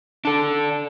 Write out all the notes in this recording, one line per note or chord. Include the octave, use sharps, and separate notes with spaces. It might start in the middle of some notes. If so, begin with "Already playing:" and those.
D4 A4